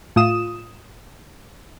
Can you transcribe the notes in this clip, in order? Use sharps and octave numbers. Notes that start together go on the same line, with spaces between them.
A2 F4 D#6 E7